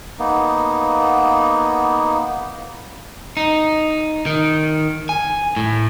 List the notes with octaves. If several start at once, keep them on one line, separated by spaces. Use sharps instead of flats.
A#3 B3 D#4
D#4
D#3
G#5
A2